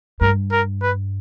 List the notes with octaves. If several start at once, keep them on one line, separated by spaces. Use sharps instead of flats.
G2 A#4
A#4
B4